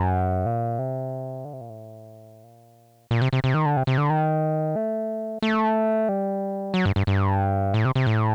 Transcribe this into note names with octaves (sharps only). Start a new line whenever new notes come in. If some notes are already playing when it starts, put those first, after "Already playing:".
Already playing: F#2
A#2
C3
D3
C3
A#2
A2
A#2
A#2
C3
C3
C3
D#3
D3
C3
C3
D3
D#3
A3
A3
G3
F#3
G2
G2
G2
A2
C3
C3
A2